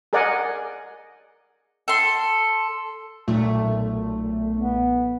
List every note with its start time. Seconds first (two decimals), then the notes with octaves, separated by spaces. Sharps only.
0.13 G#4 A#4 D5 D#5 F#5 G#5
1.88 A4 C6
3.28 B1 A#2 A3
4.57 B3